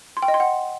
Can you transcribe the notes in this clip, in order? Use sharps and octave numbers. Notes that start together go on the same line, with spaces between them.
C6
G5
D#5
C6
F#5